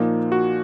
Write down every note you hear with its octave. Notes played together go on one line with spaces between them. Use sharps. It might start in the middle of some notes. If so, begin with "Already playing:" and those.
Already playing: A#2 F3 A#3 D#4
F#4